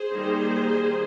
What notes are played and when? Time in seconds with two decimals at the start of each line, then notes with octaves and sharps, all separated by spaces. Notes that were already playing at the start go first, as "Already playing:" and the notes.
Already playing: G#4 C5
0.12 D#3 G3 A#3 D#4